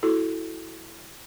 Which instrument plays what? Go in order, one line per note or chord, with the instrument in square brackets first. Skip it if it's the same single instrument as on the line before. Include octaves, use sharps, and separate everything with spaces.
[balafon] E4 F#4 A4